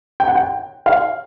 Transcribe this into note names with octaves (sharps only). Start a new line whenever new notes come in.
G5
F#5
G5
F5